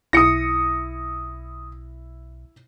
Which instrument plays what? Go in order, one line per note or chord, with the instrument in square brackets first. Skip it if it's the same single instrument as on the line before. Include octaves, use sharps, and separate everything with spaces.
[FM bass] B1 [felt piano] E4 C#7 [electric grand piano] D#6 A#6